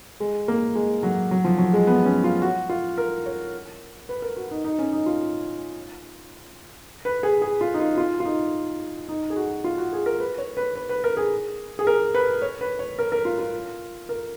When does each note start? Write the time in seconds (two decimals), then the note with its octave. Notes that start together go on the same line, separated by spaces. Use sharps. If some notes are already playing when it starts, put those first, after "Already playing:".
0.20 G#3
0.48 A#3
0.75 G#3
1.03 F#3
1.31 F#3
1.44 F3
1.58 F#3
1.73 G#3
1.87 B3
2.05 C#4
2.24 F4
2.42 F#4
2.69 F4
2.98 A#4
3.26 C#5
4.09 B4
4.22 A#4
4.37 F#4
4.51 D#4
4.64 D#4
4.79 C#4
4.92 D#4
5.06 F4
7.05 B4
7.23 G#4
7.42 G#4
7.61 F4
7.74 D#4
7.80 F4
7.98 F4
8.20 F4
8.25 D#4
9.09 D#4
9.30 G#4
9.36 F#4
9.64 F4
9.78 F#4
9.93 G#4
10.06 A#4
10.20 B4
10.38 C#5
10.57 B4
10.75 B4
10.89 B4
11.04 A#4
11.17 G#4
11.79 G#4
11.87 A#4
12.15 B4
12.42 C#5
12.61 B4
12.79 C#5
12.99 A#4
13.12 A#4
13.25 F4
13.39 F4
14.09 A#4